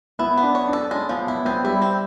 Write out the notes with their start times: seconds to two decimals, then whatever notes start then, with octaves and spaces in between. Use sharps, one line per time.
0.19 B3 E4
0.38 B3
0.43 D4
0.55 C#5
0.68 D4
0.73 A4
0.91 G#3 C#4
1.09 F3 B3
1.27 B3 E4
1.45 B3 C4
1.64 G3 E4
1.82 C4